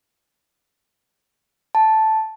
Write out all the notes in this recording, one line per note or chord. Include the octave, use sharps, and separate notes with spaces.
A5